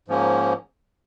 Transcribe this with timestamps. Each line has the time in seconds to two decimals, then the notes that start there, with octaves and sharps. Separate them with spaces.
0.08 G#2 F3 A#3 C#4